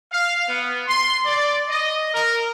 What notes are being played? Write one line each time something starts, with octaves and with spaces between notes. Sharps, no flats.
F5
B3
C6
D5
D#5
A#4